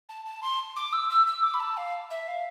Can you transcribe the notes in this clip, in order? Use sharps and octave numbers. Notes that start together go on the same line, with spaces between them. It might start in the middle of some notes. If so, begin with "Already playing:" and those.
A5
A5
C6
D6
E6
E6
E6
D6
B5
A5
F5
E5
F5